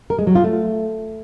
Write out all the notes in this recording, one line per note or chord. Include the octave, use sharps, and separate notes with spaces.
A#4
G#3
F#3
F4
A3